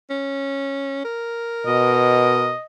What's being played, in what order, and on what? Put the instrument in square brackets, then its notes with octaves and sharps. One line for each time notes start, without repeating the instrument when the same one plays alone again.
[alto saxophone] C#4
A#4
[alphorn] B2 [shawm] D#5